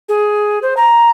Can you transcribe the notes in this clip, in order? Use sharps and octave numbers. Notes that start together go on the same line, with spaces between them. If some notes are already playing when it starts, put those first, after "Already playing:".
G#4
C5
A#5